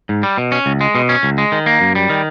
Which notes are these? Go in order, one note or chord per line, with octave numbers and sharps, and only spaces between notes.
G#2
G3
B2
C#4
C#2
G#3
B2
C#4
C#2
G#3
D#3
A#3
F#2
G3
D#3